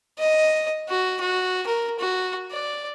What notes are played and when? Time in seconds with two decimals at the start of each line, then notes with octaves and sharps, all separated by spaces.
0.19 D#5
0.89 F#4
1.20 F#4
1.66 A#4
1.99 F#4
2.51 D5